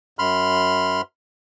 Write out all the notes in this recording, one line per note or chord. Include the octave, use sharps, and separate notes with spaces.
F#2 B5 C6 F6